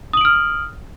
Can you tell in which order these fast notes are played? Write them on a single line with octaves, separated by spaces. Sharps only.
D#6 F#7 D7 F6